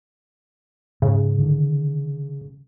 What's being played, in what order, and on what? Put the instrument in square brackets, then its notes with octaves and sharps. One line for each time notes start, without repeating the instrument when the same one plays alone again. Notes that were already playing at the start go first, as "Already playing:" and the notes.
[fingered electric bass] G#2 [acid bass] C#3
[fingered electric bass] D3 D#3